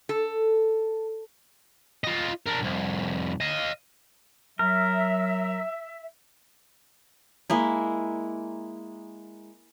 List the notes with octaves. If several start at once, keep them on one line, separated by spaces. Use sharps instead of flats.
A4
F4 D#5
D4 A#4
C2 F2
D#5 F5
F#3 A#4 E5
G#3 A#3 E4